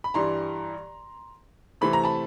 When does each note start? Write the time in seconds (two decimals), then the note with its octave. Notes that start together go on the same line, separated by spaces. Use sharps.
0.04 B5
0.14 G2 E3 G3 A#5 C6
1.81 C3 E3 A3 C4 B5
1.93 A#5
2.04 A5 B5